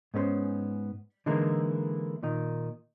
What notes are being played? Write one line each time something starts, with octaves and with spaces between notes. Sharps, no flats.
G#2 B3 C#4 B4 C5
D3 E3 G#3 A#3 D#4 E4
A#2 D#3 D#4